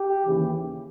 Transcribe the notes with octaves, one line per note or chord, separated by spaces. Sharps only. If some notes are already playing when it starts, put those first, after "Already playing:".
Already playing: G4
D#2 C#3 E3